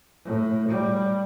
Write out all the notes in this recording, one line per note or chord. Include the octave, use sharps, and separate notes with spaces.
A2
G3